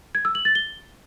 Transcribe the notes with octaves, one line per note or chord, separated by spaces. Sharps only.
G#6
E6
F#7
A6
G7